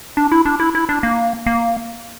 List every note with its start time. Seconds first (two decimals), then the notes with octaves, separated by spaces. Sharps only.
0.17 D4
0.32 E4
0.45 D4
0.60 E4
0.75 E4
0.89 D4
1.03 A#3
1.46 A#3